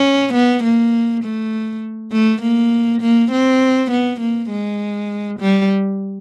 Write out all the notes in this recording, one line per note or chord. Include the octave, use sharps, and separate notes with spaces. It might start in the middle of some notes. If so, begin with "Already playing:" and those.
Already playing: C#4
B3
A#3
A3
A3
A#3
A#3
C4
B3
A#3
G#3
G3